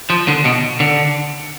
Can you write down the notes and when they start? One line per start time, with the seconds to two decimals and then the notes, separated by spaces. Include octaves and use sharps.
0.10 F3
0.28 D3
0.45 B2
0.80 D3